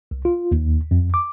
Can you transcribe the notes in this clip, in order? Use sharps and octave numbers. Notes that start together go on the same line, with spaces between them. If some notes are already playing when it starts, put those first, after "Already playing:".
C2
F4
D#2
F2
D6